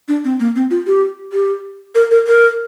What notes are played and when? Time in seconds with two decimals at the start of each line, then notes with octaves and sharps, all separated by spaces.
0.08 D4
0.24 C4
0.40 A#3
0.56 C4
0.71 F4
0.87 G4
1.32 G4
1.95 A#4
2.11 A#4
2.27 A#4